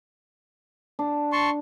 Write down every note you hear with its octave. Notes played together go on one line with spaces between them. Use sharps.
D4
A5 C6 C#6